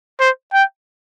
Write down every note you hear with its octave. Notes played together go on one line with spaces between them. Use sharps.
C5
G5